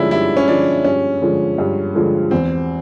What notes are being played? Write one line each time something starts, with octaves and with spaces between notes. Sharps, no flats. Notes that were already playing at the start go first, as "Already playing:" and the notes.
Already playing: G2 D3 F3 G#3 C#4 D4 E4
G2 E4
C#4
D3 F3 G#3 D4
G2 C#4
D3 F3 G#3
G2
D3 F3 G#3
E2 C4